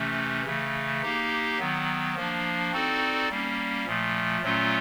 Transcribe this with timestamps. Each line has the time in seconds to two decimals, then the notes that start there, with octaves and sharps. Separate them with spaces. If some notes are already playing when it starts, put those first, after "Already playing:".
Already playing: C3 E3 A3 C#4
0.45 C#3 E3 A3
1.03 A#3 D#4 G4
1.59 D#3 F#3 B3
2.16 F3 A#3 D4
2.72 C4 D#4 F#4 A4 D5
3.29 G3 A#3 C#4
3.86 A#2 F3 A3
4.42 A#2 F#3 A3 C#4 F4